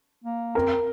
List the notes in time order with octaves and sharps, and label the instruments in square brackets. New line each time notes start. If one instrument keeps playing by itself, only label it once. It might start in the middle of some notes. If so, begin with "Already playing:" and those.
[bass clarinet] A#3
[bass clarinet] C4 [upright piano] A#4